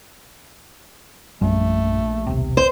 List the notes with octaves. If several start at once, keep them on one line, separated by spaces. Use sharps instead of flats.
A#1 F#2 G3 A3
D#1 B1 C3
C5